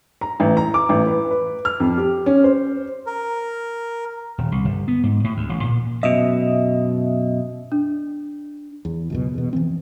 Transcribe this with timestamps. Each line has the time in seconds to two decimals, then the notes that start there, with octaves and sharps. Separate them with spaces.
0.21 A#5
0.40 A1
0.57 A#5
0.74 D6
0.89 A1
1.07 B4
1.31 B4
1.65 F6
1.80 F2
1.98 G4
2.26 C#4
2.44 C5
3.06 A#4
4.38 D#1
4.52 C2
4.65 G1
4.88 B3
5.03 G#2
5.24 A2
5.37 D2
5.49 A1
5.64 A#2
6.03 F#2 B2 D#5 E5
7.72 D4
8.85 E2
9.10 C#2 F#2 B2
9.34 E2 B2
9.53 E3 F3 C4